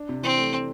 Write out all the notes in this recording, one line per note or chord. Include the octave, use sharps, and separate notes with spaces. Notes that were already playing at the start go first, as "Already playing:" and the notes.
Already playing: D4
C3
E3 C4
A3
A3